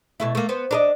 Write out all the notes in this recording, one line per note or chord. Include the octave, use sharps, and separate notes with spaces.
B2 A3 E4
A3 A#3
B3 C5
D4 A#4 D#5